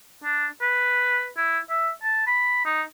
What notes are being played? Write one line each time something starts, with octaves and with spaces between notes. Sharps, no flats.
D4
B4
E4
E5
A5
B5
D#4